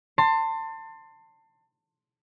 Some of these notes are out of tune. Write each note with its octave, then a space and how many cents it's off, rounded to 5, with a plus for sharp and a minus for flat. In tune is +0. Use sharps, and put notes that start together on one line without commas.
A5 +30 C6 +0